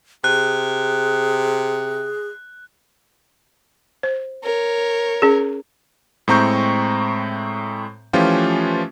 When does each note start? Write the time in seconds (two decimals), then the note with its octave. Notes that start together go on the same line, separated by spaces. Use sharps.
0.24 C3 G#4 F#6
4.03 C5
4.43 A#4 C#5
5.22 C#4 G#4
6.28 A2 G#3 C4 A#5 C#6 G6
8.13 E3 F3 A3 C#4 F4 G4